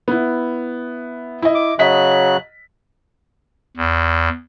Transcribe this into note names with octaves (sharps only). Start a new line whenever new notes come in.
B3 E4
E4 D#5
D6
C#3 F#3 D#5 F#6 B6
E2